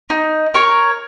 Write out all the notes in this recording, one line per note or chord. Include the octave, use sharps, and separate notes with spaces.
D#4
A#4 C#5